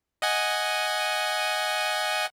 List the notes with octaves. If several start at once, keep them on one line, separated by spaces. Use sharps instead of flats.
D#5 F#5 G#5